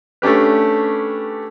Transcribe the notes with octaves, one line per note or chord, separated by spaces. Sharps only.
A3 C#4 D4 G4 B4